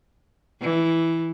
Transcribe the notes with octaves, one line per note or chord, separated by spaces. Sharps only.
E3